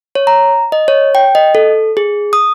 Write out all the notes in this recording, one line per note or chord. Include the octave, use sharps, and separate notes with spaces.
C#5
A#5
D#5
C#5
G5
D#5
A4
G#4
D#6